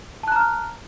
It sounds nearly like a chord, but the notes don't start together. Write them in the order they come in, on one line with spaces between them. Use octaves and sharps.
A5 F#6 A#5 F6